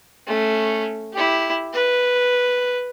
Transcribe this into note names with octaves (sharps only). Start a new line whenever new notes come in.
A3 C#4
E4 G4
B4